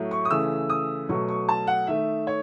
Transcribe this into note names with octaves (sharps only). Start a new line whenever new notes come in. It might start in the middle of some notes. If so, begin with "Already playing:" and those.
Already playing: A2 F#3 A3
C#6
D#6
C#3 E3 A3 E6
D#6
B2 F#3 A3 C#6
C#6
A5
F#5
D#3 A3 E5
C#5